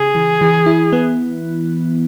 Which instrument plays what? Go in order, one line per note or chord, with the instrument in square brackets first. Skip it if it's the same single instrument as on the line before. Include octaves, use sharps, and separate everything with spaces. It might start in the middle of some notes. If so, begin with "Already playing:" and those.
Already playing: [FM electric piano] C#3 [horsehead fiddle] G#4
[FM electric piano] E3
E3
E4
B3